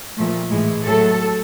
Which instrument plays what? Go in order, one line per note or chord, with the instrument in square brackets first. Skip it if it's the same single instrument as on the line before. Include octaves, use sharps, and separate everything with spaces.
[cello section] A#2 F3 A3
A2 E3 G#3
A2 F#3 A3 A4